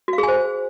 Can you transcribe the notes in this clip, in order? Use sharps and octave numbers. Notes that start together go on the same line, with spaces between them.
F#4
F5
G#4
G#5
C5